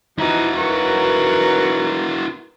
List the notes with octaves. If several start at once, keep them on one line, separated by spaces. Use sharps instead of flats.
E3 F3 D#4 E4 F#4
D#3 F#3 A#4 B4 C#6